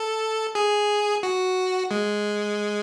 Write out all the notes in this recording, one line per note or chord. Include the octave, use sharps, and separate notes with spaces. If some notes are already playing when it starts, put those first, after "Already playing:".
Already playing: A4
G#4
F#4
G#3